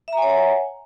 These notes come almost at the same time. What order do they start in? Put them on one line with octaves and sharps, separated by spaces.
E5 A#5 G#5 C#5 F#5